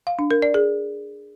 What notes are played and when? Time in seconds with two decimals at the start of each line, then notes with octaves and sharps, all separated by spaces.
0.07 F5
0.19 D4
0.31 A#4
0.42 D5
0.54 G#4